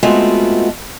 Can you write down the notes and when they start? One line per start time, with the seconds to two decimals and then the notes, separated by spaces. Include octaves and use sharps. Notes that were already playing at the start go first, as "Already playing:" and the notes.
0.03 G#3 A3 B3 C4 F4 F#4